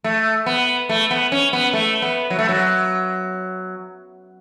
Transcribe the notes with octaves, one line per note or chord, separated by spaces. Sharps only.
A3
B3
A3
B3
C#4
B3
A3
B3
F#3
A3
F#3